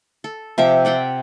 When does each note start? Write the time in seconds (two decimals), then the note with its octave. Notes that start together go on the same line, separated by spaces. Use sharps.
0.24 A4
0.58 C3 F3 E5 D6
0.85 D5 F#5 G5 C6